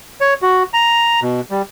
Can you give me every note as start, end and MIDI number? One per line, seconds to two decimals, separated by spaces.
0.21 0.34 73
0.42 0.63 66
0.73 1.20 82
1.22 1.41 47
1.51 1.62 55